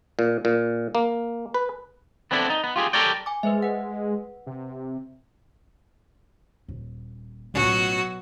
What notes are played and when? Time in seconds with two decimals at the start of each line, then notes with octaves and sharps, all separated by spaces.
0.19 A#2
0.45 A#2
0.95 A#3
1.54 B4
2.31 B3 C4 D4 E4 G4 A4
2.50 D#4
2.64 B3
2.76 F4 G4 G#4
2.93 G4 A4 A#4 C#5 D5 G5
3.26 G#5 D6
3.43 G#3 B4 C5 E5
3.62 B4 F#5
4.46 C3
6.68 D#1
7.54 A1 B2 F#3 F4 F#4